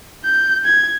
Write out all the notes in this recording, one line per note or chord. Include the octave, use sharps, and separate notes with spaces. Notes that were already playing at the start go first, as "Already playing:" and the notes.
G6
G#6